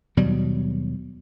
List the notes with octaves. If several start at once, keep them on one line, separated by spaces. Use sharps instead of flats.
D#2 B2 F#3 G3